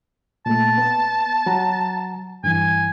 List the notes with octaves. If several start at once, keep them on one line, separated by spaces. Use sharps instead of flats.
A#2 A3 A5
B3
F#3 F#5 A#5
G2 E3 G#5